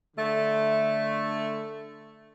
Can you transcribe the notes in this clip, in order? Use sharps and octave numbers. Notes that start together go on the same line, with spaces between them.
D3 A3